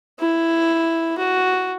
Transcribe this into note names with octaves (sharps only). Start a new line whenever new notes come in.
E4
F#4